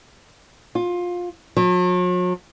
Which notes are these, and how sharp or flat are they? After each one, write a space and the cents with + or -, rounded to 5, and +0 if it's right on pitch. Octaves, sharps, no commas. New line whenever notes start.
F4 +20
F#3 -45